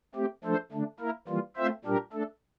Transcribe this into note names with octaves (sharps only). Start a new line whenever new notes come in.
A3 C4 G4
F3 A3 D4 A4 C5
D3 A3 D4
A#3 E4 A#4
E3 G3 A#3 F4
A3 C4 F4 C5 E5
A#2 G3 D4 G4 A#4
A3 D4 A4